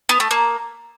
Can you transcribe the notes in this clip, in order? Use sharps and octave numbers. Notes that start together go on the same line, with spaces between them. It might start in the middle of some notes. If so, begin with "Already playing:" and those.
B3
A3
A#3